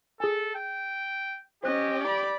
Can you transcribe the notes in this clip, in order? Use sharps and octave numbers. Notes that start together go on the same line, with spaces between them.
G#4 A4 G#5
G5
C#4 G4 C5 D#5 F#6
D5 B5